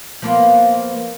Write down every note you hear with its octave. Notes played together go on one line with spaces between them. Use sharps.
F3 A#3 B3